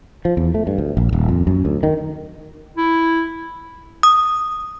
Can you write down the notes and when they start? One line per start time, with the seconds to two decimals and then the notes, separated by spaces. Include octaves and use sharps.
0.25 F3
0.37 E2
0.54 A3
0.67 G2
0.78 D2
0.97 A#1
1.13 D#1
1.28 F2
1.47 F#2
1.65 D2
1.83 D#3
2.77 E4
4.03 D#6